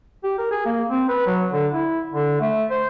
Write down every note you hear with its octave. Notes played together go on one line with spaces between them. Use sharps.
G4
A#4
G#4
A#3
C4
B4
F#3
D3
E4
D3
A3
C5